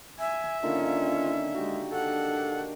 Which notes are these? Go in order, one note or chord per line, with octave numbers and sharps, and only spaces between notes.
E5 G#5
D3 D#3 A#3 C#4 F4
G#3 F#4 G4
D4 A4 F#5